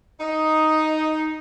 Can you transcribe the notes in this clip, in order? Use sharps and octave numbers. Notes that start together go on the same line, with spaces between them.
D#4